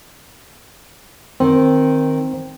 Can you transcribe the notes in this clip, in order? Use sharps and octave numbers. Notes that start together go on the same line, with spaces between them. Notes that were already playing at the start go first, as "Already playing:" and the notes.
D#3 C4